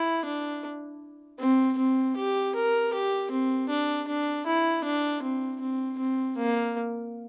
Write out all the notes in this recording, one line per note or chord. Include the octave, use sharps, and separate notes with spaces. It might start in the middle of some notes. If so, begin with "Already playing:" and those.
Already playing: E4
D4
C4
C4
G4
A#4
G4
C4
D4
D4
E4
D4
C4
C4
C4
A#3